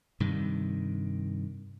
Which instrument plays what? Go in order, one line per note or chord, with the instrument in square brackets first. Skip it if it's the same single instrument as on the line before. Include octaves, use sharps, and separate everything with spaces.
[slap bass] G2 C3 D#3